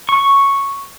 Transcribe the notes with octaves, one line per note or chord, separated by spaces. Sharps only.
C#6